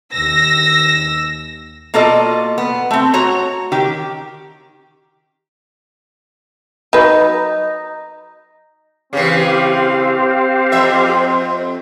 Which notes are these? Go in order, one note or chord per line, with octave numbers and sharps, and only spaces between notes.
D#2 E6 A#6
B2 A#3 F4 A4 D5 D#5
B3
A3 C4
F#4 C#5 A#5
D#3 G4
F#3 D#4 B4
C#3 E3 C4 G4 F5
F2 E5